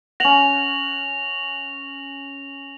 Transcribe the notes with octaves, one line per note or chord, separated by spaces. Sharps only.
C#4 F#5 A#6 F7 F#7